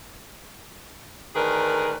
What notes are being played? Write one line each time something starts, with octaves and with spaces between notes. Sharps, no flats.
D2 D#3 D4 G#4 A#4 B4